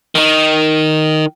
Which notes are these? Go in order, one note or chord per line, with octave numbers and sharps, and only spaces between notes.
D#3 D#4